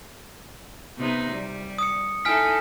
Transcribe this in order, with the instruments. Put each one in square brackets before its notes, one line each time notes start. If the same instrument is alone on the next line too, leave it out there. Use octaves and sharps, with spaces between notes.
[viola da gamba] C3 B3 D#4
G3
[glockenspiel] D#6 C#7
[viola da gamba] D#4 E4 A4 [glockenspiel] G#5 F6 B6